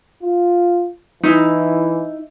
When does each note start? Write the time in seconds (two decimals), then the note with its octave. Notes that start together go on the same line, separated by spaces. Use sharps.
0.23 F4
1.23 E3 D#4 E4